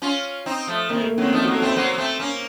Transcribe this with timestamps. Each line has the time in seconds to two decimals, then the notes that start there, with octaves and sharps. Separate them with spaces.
0.02 C#4 F4
0.46 C4 D#4
0.67 F3 A3
0.89 C3 D#3 A#3
1.01 A3
1.11 A#3
1.18 D#3 F#3 C4 C#4
1.33 F3 A3 D#4
1.44 F#3 A#3 F#4
1.55 A4
1.62 A3 C4 C5
1.76 F#3 A#3 C5
1.94 A#3
1.98 A3 C4
2.20 A#3 C#4